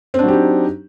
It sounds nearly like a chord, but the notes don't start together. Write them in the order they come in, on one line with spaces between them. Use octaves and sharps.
C4 D4 F#3 G4 D#4